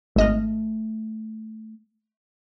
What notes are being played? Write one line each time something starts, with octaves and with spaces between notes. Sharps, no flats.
G#1 A3 D#5 F6